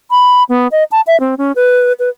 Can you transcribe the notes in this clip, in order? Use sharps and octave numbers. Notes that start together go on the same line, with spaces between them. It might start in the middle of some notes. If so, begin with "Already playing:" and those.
B5
B3
D#5
A5
E5
C4
C#4
B4
B4